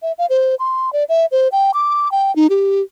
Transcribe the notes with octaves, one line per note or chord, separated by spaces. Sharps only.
E5
F5
C5
C6
D5
E5
C5
G5
D6
G5
D#4
G4